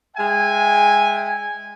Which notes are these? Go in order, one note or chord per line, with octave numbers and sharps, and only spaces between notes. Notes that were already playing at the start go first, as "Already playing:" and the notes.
G#3 E5 G5 G#5